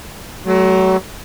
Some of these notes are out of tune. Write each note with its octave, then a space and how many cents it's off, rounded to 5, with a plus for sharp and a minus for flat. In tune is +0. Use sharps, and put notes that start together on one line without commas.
F#3 +30 A3 -20